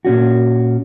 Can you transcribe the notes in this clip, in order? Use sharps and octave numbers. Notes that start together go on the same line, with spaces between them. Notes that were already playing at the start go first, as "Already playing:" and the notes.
A#2 C#4 F#4